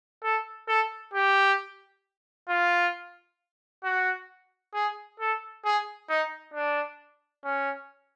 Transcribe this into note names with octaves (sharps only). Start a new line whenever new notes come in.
A4
A4
G4
F4
F#4
G#4
A4
G#4
D#4
D4
C#4